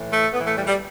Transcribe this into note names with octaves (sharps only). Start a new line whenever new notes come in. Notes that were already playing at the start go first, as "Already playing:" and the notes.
Already playing: A2 E3
A3
A2 E3 B3
A3
G3
G3